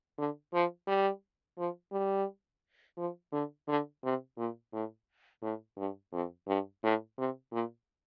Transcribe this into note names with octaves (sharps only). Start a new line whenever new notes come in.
D3
F3
G3
F3
G3
F3
D3
D3
C3
A#2
A2
A2
G2
F2
G2
A2
C3
A#2